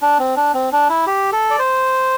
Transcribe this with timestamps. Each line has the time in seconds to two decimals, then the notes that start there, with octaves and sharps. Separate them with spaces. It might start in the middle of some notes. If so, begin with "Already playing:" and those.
0.02 D4
0.19 C4
0.36 D4
0.54 C4
0.72 D4
0.89 E4
1.07 G4
1.33 A4
1.51 D5
1.59 C5